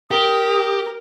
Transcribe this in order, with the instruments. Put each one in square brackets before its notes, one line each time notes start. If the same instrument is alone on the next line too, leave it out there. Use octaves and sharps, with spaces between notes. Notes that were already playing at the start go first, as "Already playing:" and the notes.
[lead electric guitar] G4 [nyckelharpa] A#4 [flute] D#6